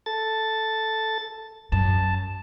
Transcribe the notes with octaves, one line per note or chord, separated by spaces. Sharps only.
A4 A6
F#2 A5